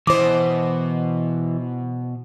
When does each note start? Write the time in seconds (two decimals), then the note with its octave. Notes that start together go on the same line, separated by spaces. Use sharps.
0.07 B2 E3 C5 D#5 D6